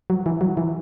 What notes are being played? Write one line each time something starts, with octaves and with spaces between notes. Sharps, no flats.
F#3
E3
F#3
E3